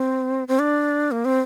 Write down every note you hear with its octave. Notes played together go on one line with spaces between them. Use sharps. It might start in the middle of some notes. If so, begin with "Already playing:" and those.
Already playing: C4
C4
D4
A#3
C4